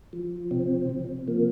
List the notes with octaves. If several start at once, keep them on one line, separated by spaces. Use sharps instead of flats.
F3
C3 C4
C3
F3 A#3